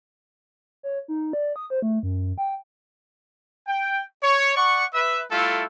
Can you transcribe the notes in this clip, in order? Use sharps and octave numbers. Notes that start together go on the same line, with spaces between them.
C#5
D#4
D5
D#6
C5
A3
F#2
G5
G5
C#5
D5 F#5 C#6
B4 E5
G3 A3 E4 F4 A4